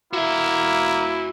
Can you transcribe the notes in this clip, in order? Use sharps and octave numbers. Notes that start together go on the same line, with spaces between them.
A#3 E4 F#4 E5